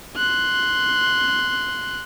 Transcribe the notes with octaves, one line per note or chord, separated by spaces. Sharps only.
C6 F#6